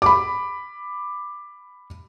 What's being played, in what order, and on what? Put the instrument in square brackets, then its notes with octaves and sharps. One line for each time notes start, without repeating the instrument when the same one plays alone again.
[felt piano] B5 D6